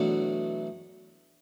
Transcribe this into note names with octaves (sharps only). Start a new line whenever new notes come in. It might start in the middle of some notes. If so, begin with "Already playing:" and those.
Already playing: E2 B2 F#3 A3 D4